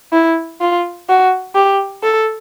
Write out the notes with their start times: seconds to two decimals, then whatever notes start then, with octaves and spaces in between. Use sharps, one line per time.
0.13 E4
0.61 F4
1.09 F#4
1.55 G4
2.03 A4